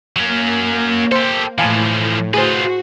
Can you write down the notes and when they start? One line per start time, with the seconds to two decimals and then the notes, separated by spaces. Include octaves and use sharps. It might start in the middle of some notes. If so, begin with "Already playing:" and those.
0.16 F#3 A#3 C#4
1.12 G4 A4 C5
1.58 A2 E3 F3 F5 G#5 A5
2.34 F4 F#4 G#4 B4 C5